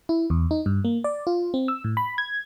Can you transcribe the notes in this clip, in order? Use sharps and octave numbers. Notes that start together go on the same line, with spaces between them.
E4
E2
D#4
G2
A#3
D5
F4
C4
E6
A2
B5
G#6